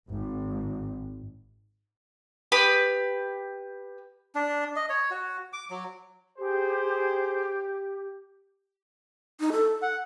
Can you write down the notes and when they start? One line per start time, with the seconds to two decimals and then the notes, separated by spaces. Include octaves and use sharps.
0.12 G#1
2.52 G4 B4 B5 D#6
4.35 D4
4.76 D#5
4.90 C#5
5.11 F#4
5.53 D6
5.70 F#3
6.38 G4 G#4 C5
9.40 D#4
9.52 A4
9.82 F#5